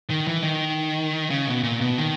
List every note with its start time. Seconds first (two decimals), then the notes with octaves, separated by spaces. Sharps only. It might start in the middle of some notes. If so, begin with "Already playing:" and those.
0.10 D#3
0.28 E3
0.44 D#3
1.30 C#3
1.47 B2
1.63 A#2
1.81 B2
1.98 D#3